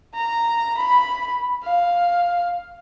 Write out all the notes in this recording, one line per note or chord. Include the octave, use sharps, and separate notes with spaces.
A#5
B5
F5